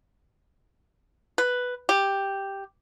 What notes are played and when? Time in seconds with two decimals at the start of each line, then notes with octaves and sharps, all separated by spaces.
1.38 B4
1.89 G4